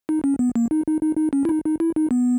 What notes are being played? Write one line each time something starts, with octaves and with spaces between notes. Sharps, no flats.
D#4
C#4
B3
A#3
D#4
D#4
D#4
D#4
C#4
E4
D#4
D#4
E4
D#4
B3